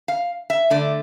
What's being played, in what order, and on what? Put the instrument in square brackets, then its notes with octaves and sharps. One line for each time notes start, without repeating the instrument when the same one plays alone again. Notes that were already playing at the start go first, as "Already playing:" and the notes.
[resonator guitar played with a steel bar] F5
E5
D3 A3 D5